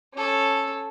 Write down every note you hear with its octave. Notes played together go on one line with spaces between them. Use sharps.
C#4 A4